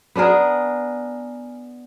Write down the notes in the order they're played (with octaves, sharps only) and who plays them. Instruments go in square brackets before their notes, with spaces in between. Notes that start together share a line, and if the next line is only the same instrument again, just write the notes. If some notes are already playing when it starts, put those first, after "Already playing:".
[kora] B3 D4 G#4 A#4